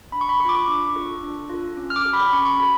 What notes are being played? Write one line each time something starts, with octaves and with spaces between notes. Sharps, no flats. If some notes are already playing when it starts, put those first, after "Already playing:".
D4 B5
C#6
B5
A4 C#6
F4 D6
C#6
D4
F4 A4
D4
F4 A4
C#4
F6
D6
F#4 A4
B5
B5
C#4 C#6
C#6
F#4 A4 B5